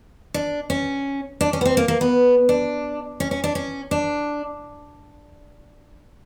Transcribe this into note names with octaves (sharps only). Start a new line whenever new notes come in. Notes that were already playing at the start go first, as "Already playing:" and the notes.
D4
C#4
D4
C#4
B3
C4
A#3
A#3
B3
D4
C#4
C#4
D4
C#4
D4